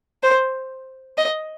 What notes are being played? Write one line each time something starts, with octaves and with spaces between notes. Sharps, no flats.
C5
D#5